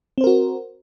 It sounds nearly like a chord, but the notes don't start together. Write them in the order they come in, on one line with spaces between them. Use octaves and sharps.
C4 C5 A#4 F#4